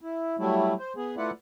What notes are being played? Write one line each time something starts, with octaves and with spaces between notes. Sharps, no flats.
E4
F#3 G3 A3 E4
C5
B3 G#4
A3 E4 F4 B4 D5 F#5